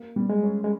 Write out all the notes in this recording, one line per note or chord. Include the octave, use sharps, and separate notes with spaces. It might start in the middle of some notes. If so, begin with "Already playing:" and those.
Already playing: A#3
G3
G#3
C#4
G#3